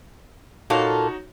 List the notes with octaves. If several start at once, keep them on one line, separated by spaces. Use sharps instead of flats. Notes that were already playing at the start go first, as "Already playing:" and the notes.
A#2 D#4 F#4 A4 C#5 F5